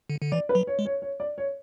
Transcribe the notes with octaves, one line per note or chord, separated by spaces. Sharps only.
D3
D3
E3 D5
B4
F#3
C#5
G#3
C#5
C#5
D5
C#5